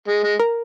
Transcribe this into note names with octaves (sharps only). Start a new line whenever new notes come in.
G#3
G#3
A#4